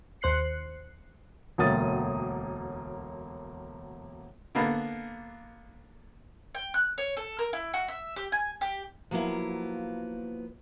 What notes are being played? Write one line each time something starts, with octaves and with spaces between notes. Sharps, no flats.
D#2 C5 F#6 C7 C#7
E1 D2 F#3 A#3 D#6 A6
D3 A#3 B3
G5
F#6
C#5
A4
A#4
E4
F#4
E5
G4
G#5
G4
F3 F#3 A#3 B3 E4 F5